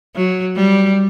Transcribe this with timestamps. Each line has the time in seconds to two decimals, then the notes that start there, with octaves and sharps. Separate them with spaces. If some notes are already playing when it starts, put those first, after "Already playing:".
0.15 F#3
0.56 G3